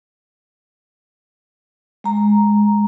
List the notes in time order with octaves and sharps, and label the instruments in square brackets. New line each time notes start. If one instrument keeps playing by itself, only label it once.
[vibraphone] G#3 A#5